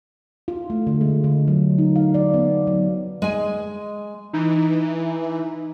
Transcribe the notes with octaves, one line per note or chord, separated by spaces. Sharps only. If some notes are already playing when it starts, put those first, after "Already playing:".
F4
A3
D3
G#3
D3
F#3
D#4
F5
D5
B3
F#3
G#3 G#5
E3 D#4